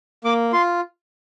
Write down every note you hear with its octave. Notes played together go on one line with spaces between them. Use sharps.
A#3 D6
F4 C6